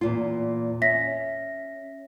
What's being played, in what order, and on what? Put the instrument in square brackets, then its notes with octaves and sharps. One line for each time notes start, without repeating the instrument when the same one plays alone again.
[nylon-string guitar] E2 A#2 F4
[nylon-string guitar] C#4 [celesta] E5 A#6 B6